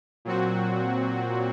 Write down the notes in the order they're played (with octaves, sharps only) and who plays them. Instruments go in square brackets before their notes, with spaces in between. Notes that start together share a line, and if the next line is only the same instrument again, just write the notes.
[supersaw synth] A#2 F#3 C4 F#4